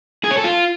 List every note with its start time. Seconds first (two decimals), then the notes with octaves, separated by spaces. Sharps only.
0.24 G#4
0.31 C#5
0.37 A4
0.44 F4